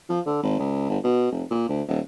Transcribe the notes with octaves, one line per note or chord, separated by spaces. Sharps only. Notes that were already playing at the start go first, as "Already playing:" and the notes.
F3
D3
G#1
C#2
G1
B2
F1
A#2
D2
D#1